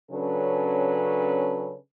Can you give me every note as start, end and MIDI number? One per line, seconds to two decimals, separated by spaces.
0.11 1.75 49
0.11 1.75 54
0.11 1.75 61
0.11 1.75 62
0.11 1.75 69
0.11 1.75 71